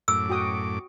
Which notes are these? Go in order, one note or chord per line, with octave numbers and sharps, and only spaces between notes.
F#2 A2 D6 E6
F#4 G5 D#6